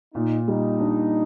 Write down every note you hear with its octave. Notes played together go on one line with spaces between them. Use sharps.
A#2 D#4
G3 D#4
D4